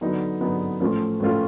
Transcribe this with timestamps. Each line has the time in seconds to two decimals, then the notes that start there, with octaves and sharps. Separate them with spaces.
0.01 D3 F#3 B3 D#4
0.41 D3 F#3 B3 D#4
0.80 A2 F3 A3 C#4 F4
1.20 A2 F3 A3 C#4 F4